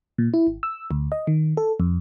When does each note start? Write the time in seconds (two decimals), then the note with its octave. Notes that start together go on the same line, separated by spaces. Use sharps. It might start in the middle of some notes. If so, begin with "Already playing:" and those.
0.18 A#2
0.34 E4
0.47 G#1
0.63 E6
0.91 D2
1.12 D#5
1.27 D#3
1.57 A4
1.80 F2